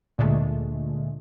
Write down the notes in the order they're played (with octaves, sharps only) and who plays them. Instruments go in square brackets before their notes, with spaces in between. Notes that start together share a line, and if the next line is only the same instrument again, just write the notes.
[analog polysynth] D2 A#2 D3 G#3 A3